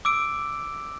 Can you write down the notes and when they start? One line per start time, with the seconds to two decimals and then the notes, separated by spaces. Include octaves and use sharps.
0.05 D6 E6 D7